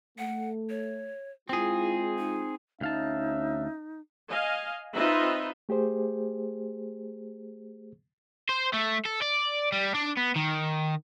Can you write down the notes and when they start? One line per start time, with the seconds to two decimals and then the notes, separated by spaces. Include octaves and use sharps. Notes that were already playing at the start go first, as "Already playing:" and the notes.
0.18 A3 F#5
0.70 C#5
1.49 G#3 C4 E4 F4 G#4
2.18 D#4
2.81 D2 C#4 D#4 E5 F5 A5
4.29 D#5 F5 G#5
4.96 C4 D#4 F4 B4 D#5 E5
5.69 A3 G4 G#4 C5
8.49 C5
8.74 A3
9.06 A4
9.22 D5
9.72 G3
9.95 D4
10.17 B3
10.36 D#3